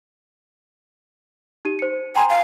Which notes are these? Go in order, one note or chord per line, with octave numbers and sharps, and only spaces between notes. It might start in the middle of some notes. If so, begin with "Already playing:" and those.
D#4 G4 D#7
C5 C#7
G5 G#5 A#5 C6
F5